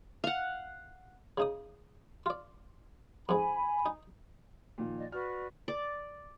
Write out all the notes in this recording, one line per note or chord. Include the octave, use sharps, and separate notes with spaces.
F5 F#5
C#3 D#4 D#6
F4 D5
F2 G#2 G#5 B5
D#4
A#2 D#3 F3
D5 D#5
F#4 B4 D5 F6
D5